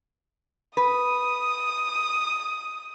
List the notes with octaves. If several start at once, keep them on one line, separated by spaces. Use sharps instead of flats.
B4 D#6